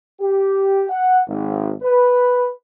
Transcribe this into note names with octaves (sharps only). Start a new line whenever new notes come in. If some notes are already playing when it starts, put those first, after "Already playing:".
G4
F#5
G#1
B4